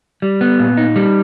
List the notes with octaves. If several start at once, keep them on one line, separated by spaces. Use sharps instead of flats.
G3
B3
A#2
D#4
G3